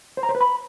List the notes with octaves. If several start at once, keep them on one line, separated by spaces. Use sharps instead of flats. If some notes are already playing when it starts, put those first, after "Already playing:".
C5
A#5
C5
B4
B5